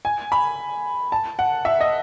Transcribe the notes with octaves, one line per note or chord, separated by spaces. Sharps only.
G#5
B5
A5
F#5
E5
D#5